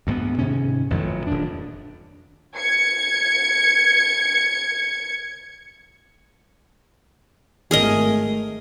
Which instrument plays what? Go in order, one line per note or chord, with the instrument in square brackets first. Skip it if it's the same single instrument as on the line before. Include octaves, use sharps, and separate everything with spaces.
[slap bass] D2 G#2 G3 B3
G#2 C3 D#3 C#4
A1 F2 D#3 F#3
D#1 D4
[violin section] G#6 C#7
[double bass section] G#1 A3 [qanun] G#4 A#4 D#5